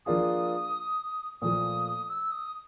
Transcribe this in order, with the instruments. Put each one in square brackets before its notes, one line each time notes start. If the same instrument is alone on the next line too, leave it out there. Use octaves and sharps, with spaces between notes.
[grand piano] F3 A#3 D4 F4 G#4 [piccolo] D#6
[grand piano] A#2 F3 A3 [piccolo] D#6
[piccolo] E6
D#6